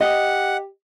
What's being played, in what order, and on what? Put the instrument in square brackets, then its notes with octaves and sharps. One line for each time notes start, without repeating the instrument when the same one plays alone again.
[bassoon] G4 [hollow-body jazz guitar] D#5 [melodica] F#5